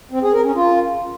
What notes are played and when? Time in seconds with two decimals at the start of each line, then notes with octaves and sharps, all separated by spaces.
0.11 C4
0.22 G#4
0.33 A#4
0.44 C#4
0.55 F4